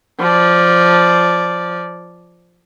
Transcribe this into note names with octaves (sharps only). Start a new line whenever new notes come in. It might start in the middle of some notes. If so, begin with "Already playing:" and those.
F3 D5